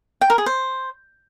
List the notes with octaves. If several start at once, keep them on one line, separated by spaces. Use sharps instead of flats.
G5
A#4
G#4
C5